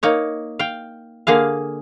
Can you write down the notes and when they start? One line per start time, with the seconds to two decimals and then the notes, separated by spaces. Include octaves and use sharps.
0.03 A#3 D#4 C#5
0.59 F5 G5
1.27 D3 A#3 G#4 F5